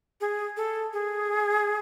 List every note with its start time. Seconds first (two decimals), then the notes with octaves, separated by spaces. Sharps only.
0.21 G#4
0.57 A4
0.93 G#4